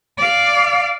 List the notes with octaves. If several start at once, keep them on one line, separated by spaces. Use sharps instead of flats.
D5 F5